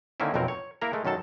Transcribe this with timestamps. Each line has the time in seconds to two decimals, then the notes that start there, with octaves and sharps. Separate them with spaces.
0.20 D3 D#3 A#3 C4 C#4 E4
0.34 B1 F2 B2 F#3 C4 A#4
0.48 C#5
0.81 A#3 E4 A#4 A#5
0.93 G#3 A3
1.05 F#2 D#3 F#3 A4 A5